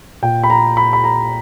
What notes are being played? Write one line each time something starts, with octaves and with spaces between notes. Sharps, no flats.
A#2 G5
B5
A#5
B5
B5
A#5